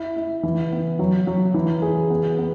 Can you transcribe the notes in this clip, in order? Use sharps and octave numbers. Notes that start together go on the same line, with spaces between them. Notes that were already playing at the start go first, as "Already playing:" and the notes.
Already playing: E4
E4
E3
B3
F#3
F#3
E3
G#4
B3
B3